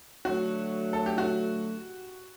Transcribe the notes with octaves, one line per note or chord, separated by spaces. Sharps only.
D3 F#3 A3 F#4
A4
G4
F#4